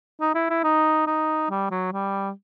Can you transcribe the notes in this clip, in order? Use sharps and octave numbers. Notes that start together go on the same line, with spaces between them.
D#4
E4
E4
D#4
D#4
G3
F#3
G3